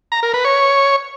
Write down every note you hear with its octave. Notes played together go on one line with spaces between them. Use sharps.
A#5
A#4
B4
C#5